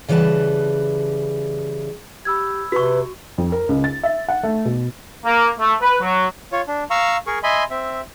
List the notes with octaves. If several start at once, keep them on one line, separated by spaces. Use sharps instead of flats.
C#3 E3 G3 B4 A5
G4 B5 E6 G#6
C3 F#4 B4 C#6
F2
A#4
C#2
A6
E5
F#5
A3
B2
A#3
A3
B4
F#3
F4 C#5
D4
F5 A#5 C#6 E6
G#4 A#4 C#6
D#5 E5 G#5 B5 C6
C4 E5